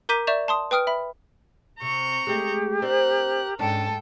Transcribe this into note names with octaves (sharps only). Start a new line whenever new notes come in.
A#4 A#5 D6 G6 B6 D#7
D5 E5 C#6 G6 E7 F7
A5 C6 D#6
B4 G5 D#6 F6 D7
E5 B5
C3 A#5 C#6 G6
G#3 A3 G4
C4 D4 A#4 C5 F#6
G#2 C#4 D4 A4 G5 A5